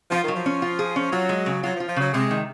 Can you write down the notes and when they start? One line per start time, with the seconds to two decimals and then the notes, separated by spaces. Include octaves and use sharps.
0.11 F3 F4
0.24 D#3 F#3
0.36 F3
0.46 C#4
0.62 F4
0.79 G#4
0.96 C#4
1.12 F#3 F4
1.29 G#3
1.46 C#3
1.63 F#3 F4
1.76 F3
1.80 F4
1.88 F3
1.96 C#3 F#3
2.13 C3 G#3
2.31 D#3